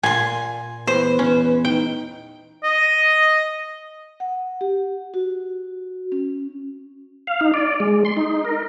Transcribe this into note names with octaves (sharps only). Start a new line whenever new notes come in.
A#2 G#5 C6
E2 B4 C5
C#4
D#4 G5
D#5
F#5
G4
F#4
C#4
F5
D#4
D5
G#3
C6
D#4
A#4